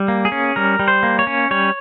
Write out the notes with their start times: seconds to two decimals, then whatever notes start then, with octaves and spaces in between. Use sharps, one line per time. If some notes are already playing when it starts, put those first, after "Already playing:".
Already playing: G3
0.08 A#3
0.25 G#4
0.32 C#4
0.56 G3 A#4
0.79 G3
0.88 C5
1.03 A#3
1.19 C#5
1.27 C#4
1.51 G3 C#5